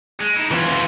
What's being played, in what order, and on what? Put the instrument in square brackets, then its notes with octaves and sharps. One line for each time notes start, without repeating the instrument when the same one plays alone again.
[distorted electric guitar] G#3
D#4 E4
[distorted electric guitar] B2 C#4 [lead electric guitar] E3 F4
[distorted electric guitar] C#2 F#4